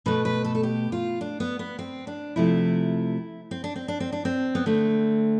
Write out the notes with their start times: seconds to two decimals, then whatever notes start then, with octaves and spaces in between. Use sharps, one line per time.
0.06 B2 A3 B4
0.25 B4
0.45 A4
0.55 A4
0.63 G4
0.92 F4
1.21 D4
1.40 B3
1.59 B3
1.79 C4
2.07 D4
2.36 C3 F3 A3 E4
3.51 C4
3.64 D4
3.76 C4
3.88 D4
4.00 C4
4.12 D4
4.25 C4
4.55 B3
4.66 D3 A3 C4